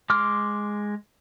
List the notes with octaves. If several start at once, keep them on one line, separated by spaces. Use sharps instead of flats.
G#3 C6 D6 F6